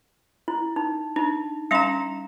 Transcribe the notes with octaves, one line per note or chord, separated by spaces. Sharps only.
E4
D#4
D4 D#4
G3 C#4 F5 A#5 C6